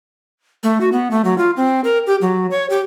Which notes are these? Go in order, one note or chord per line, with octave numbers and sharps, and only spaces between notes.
A3
F#4
B3
A3
F#3
F4
C4
A#4
G4
F#3
C#5
G4